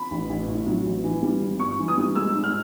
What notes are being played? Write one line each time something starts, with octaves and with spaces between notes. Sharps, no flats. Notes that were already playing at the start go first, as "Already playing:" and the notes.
Already playing: B5
A1
A1
A2
F#3
A1
E3
G3
G#1
G2 C#6
E3
D#6
G3
G#3 E6
G#2
F6